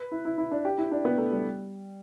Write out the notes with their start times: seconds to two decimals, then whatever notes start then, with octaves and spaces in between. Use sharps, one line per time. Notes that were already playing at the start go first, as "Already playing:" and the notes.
Already playing: B4
0.11 E4
0.25 E4
0.38 E4
0.52 D4
0.65 G4
0.78 E4
0.92 D4
1.05 B3
1.18 A3
1.32 G3